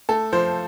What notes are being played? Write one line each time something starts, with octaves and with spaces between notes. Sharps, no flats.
A3 A4
F3 C5